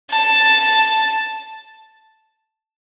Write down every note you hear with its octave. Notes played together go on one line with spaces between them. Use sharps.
A5